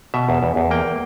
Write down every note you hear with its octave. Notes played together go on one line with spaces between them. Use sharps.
B2 E5
E2
E2
E2
A#3 G5